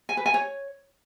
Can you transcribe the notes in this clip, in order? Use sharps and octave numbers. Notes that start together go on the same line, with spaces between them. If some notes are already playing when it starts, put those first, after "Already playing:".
G#5
B4
G#5
C#5